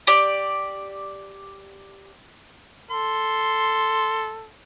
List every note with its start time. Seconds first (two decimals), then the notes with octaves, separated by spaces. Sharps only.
0.07 G4 D5
2.91 A4 C6